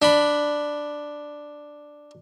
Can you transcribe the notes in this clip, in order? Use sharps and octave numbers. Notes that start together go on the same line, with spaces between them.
D4 B5